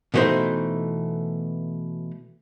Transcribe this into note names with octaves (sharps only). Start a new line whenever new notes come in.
B2 E3 A3 D#4 C5